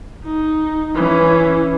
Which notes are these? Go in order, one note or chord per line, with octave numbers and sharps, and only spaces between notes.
D#4
E3 C#4